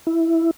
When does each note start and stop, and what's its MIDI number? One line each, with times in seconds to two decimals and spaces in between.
0.07 0.51 64